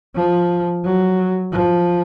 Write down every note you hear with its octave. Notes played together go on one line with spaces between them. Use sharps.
F3
F#3
F3